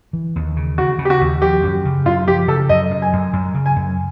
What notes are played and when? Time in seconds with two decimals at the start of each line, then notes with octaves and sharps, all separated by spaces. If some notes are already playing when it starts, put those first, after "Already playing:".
0.13 E3
0.36 D#2
0.56 C#3
0.78 C#3 F#4
0.99 C#3
1.05 G4
1.10 F#4
1.21 D#2
1.42 F3 G4
1.63 F#2
1.85 C#3
2.05 F#2 F4
2.28 F3 G4
2.48 C#3 A4
2.69 F#2 D#5
2.91 F#2
3.02 G#5
3.13 F#2
3.33 F#2
3.54 C#3
3.66 G#5
3.76 F#2